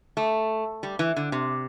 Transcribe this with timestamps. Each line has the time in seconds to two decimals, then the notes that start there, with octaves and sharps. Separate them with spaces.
0.17 A3
0.83 G3
0.99 E3
1.16 D3
1.32 C3